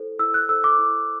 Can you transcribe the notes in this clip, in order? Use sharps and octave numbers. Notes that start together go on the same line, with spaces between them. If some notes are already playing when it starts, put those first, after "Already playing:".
Already playing: E4 A4 C5
E4 E6
F#6
A4 C5 E6
D6
E4